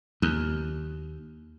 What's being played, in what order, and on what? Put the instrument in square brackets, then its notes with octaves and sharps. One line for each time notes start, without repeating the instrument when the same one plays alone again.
[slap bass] D#2